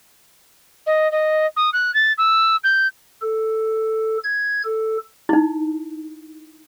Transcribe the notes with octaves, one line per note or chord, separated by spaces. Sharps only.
D#5
D#5
D#6
F#6
A6
E6
G6
A4
G#6
A4
D#4 E4